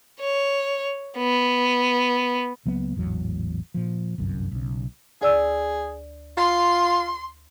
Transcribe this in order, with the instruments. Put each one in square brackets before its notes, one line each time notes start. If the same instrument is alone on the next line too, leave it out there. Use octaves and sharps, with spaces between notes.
[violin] C#5
B3
[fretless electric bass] C#2 F#3 A#3 B3
A1 E2 G#2 F#3
A#2 F3
G1 C2 F#2
B1 C#3
[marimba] D2 D5 E6 [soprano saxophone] G#4
[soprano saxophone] F4 [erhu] C6